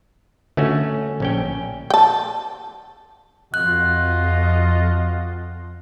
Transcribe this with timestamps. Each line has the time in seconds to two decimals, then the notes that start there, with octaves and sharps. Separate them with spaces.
0.57 D3 A3 C#4 F#4
1.20 A#1 C#4 G5
1.90 G5 A5
3.54 F2 F4 F#4 D#5 F#6